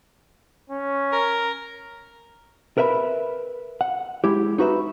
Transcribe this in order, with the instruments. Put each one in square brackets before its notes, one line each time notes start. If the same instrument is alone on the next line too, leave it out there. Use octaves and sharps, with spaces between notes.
[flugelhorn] C#4
[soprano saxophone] A#4
[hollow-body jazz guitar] A#4 B4 E5 G#5 B5
F#5
G#3 E4 G4
D#4 F#4 B4 E5